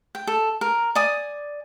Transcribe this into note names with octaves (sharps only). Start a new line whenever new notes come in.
G5
A4
A#4
D5 G#5 D#6